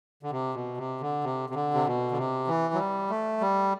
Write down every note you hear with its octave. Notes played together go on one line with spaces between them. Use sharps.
D3
C3
B2
C3
D3
C3
C3
D3
C3
B2
D3
C3
E3
F#3
G3
A3
G3